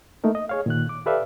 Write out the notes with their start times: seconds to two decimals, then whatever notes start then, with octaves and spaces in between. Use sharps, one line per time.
0.24 A3 A#3 D#4 A#4
0.35 D#5
0.49 G#4 C#5 F5
0.66 A#2 D#3 F#6
0.89 D6
1.06 G4 A4 B4 D5 E5 F5